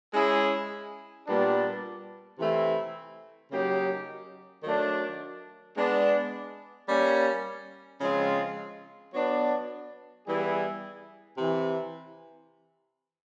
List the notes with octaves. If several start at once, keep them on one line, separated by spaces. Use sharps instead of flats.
G#3 C#4 E4 G#4
A#2 G3 B3 D4
C3 E3 A3 C4 E4
C#3 F#3 A#3 D#4 G4
D#3 F#3 A3 D4
G#3 B3 D4
G3 A#3 C#4
C#3 F3 G#3 C4 F4
F#3 B3 D4
E3 G3 B3 E4 G#4
C3 E3